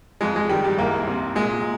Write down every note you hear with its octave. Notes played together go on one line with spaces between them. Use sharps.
F2 G#3
G#3
D#3 G3
G3
C2 A#3
C3
A#2 G#3